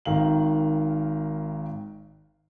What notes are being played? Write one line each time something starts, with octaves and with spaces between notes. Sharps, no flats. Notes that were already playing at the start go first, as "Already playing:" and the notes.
G#1 D#3 F5 F#7